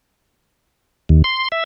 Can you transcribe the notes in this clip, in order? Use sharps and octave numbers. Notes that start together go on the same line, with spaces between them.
D#2
C6
E5